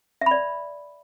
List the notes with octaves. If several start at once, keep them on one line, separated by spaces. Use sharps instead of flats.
D5 E5 B5